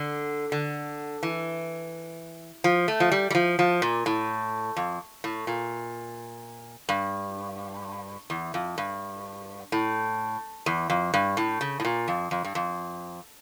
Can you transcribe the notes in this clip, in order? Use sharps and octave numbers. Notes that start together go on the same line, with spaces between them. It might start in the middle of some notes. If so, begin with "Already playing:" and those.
Already playing: D3
D3
E3
F3
A3
F3
G3
G3
F3
F3
A#2
A2
F2
A2
A#2
G2
E2
F2
G2
A2
E2
F2
G2
A2
C#3
A2
A#2
F2
F2
G2
F2